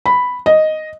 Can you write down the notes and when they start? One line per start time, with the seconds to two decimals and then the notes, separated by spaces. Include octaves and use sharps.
0.06 B5
0.46 D#5